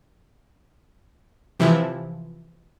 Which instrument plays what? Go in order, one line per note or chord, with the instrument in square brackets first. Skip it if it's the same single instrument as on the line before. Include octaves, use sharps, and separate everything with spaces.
[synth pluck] C3 E3 F3 E4